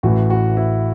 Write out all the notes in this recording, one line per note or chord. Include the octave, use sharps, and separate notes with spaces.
A1 A2 E3 F#4
F#4
E4